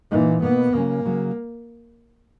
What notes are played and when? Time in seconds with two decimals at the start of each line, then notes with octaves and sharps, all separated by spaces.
0.11 A#2 E3 A#3 D#4
0.42 B2 A#3 B3 D#4
0.73 C#3 F#3 A#3 C#4
1.05 C#3 F#3